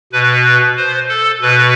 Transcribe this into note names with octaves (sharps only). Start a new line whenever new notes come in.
B2 B4
C5
A4
B2 B4